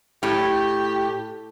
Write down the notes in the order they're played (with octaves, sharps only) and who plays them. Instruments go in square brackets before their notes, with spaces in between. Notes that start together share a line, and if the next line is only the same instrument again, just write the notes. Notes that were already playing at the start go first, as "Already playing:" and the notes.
[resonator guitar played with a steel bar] A2 [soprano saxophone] G4